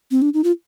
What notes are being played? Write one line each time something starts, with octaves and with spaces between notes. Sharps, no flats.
C4
D4
D#4
F4